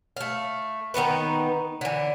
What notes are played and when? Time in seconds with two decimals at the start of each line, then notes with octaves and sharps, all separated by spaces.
0.17 A3 F5
0.94 D#3 B3 D#4 B4
1.81 D3 E3